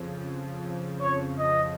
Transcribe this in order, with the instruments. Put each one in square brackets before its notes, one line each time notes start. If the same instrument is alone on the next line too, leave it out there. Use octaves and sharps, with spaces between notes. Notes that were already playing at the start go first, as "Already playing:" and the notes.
Already playing: [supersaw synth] F2 C#3 F3
[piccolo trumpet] C#5
D#5